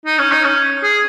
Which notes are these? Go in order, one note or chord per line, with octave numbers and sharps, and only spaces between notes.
D#4
C#4
D#4
C#4
G#4